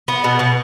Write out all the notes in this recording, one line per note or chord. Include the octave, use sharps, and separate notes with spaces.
B3
B2
B2